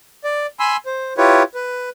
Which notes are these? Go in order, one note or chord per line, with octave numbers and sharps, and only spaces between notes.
D5
G#5 B5 C6 E6
C5
E4 F4 G4 B4 C#5
B4